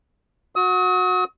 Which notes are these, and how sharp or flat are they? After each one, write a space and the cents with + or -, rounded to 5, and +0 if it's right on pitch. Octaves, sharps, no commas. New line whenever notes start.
F#4 -20 D#6 +40